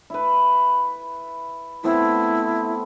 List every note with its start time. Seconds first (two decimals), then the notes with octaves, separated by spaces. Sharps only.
0.10 E4 B4
1.84 A3 B3 C4 E4